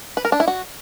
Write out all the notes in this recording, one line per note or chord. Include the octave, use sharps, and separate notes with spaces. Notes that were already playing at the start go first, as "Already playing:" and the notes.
B4
A#4
D4
E4
F#4